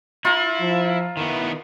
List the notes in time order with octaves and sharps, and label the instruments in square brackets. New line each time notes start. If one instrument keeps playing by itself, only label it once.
[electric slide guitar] E4 [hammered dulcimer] F4 A#5
[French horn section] F3
[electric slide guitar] D#3 B3 [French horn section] E4